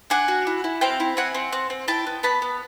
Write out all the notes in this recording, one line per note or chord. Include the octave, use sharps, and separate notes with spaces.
D4 F#5 G#5
F#4
E4
E4
C4 F5 G5
E4
C4 F#5 G#5
C4
C4
C4
E4 G5 A5
B3
B3 A5 B5
B3